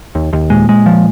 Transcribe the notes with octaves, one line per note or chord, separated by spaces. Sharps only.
D#2
D#2
A#2 G#3
G#3
F3